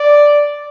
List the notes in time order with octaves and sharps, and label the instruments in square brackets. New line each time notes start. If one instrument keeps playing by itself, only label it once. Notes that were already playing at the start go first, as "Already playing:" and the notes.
Already playing: [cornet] D5